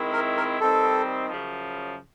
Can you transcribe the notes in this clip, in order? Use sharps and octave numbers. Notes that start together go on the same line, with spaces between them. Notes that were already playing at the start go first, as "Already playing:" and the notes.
Already playing: D#3 G#3 C4 E4
A#4
A#4
D#3 G3 C4 D#4 A4
F#2 C#3 F3